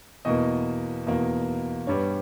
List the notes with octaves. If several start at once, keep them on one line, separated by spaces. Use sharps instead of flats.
E2 B2 A#3 D#5
E2 B2 A#3
G2 G3 B3 C#5